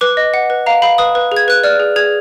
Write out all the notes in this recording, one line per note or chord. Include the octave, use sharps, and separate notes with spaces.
B4 D6
D#5
F#5
B4
F5 A#5
F5 B5
B4 D#6
B4
G#4 G#6
B4 F#6
D5 F6
G#4
G#4 G#6